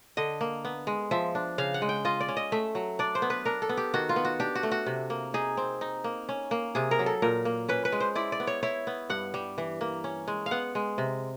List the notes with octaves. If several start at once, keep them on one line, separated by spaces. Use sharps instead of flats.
D3 D#5
A#3
B3
G#3
F3 E5
D4
C#3 F5
F#5
G#3
G5
F4 D#5
D5
C#4
D#5
A3 E5
F#3
D4 D5
C5
B3
B4
D4 A#4
A4
B3
G4
D#3 F#4
F4
B3
F#4
D4 G4
F#4
A3
F#4
C3
A#3
D#4 G#4
C4
D#4
A#3
C#4
A#3
C3 G#4
A#4
F#3
A4
A#2 A#4
A#3
C#4 B4
B4
G#3
C5
E4 D5
D5
B3
C#5
E4 C#5
B3
G2 F#5
G3
E3
A#3
C#4
G#3
F5
B3 F#5
G#3
C3